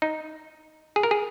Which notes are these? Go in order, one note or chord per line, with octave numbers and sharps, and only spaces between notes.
D#4
G#4
A#4
G#4